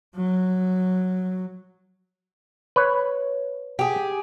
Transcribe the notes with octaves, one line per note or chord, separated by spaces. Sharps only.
F#3
B4 C#5
G4 G#4